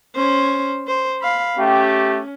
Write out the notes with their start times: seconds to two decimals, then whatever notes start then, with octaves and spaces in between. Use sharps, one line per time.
0.16 C#4 C5
0.87 C5
1.22 F5 B5
1.58 A3 C#4 G4